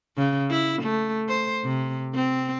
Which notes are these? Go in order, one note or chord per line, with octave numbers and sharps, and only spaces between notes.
C#3
E4
A3
C5
C3
C4